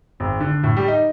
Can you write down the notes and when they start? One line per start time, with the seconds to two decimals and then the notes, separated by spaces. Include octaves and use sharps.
0.20 G#1
0.40 D3
0.63 A2
0.77 G3
0.88 D#4